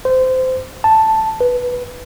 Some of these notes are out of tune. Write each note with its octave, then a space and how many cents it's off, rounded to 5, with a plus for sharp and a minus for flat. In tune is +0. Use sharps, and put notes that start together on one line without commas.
C5 -20
A5 +0
B4 +0